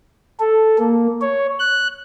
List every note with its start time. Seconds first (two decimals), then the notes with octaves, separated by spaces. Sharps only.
0.40 A4
0.79 A#3
1.21 C#5
1.59 F#6